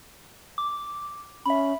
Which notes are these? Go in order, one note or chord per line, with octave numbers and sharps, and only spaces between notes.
D6
C#4 E5 B5